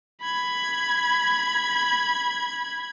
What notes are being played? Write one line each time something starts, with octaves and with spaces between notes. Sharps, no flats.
B5 G#6